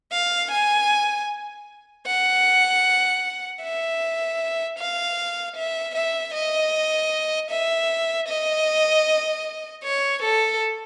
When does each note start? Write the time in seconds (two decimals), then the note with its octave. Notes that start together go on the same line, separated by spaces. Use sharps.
0.12 F5
0.51 G#5
2.06 F#5
3.62 E5
4.78 F5
5.56 E5
5.95 E5
6.34 D#5
7.50 E5
8.28 D#5
9.84 C#5
10.22 A4